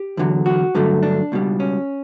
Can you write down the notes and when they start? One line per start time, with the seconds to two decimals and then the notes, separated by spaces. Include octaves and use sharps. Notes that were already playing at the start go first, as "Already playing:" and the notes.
Already playing: G4
0.17 E2 D3 F#3
0.46 F#4
0.75 G2 D3 F#3 A3
1.03 D4
1.32 C#2 B2 G3
1.60 C#4